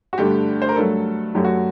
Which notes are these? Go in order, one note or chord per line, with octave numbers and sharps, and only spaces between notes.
F#4
G2 D3 A3 G4
C5
A#4
G2 F#3 A3 A4
F#2 F#3 A3 G4
F#4